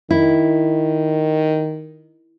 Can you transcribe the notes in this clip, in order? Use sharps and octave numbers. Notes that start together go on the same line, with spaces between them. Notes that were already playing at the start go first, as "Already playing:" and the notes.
D#3 E4